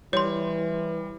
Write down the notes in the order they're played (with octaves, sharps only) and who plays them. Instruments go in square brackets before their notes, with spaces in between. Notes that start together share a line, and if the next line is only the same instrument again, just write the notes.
[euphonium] E3 [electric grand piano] G3 [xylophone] C#5 C6